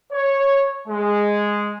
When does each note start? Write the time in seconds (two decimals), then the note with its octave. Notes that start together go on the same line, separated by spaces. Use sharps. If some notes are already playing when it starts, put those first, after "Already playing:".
0.12 C#5
0.88 G#3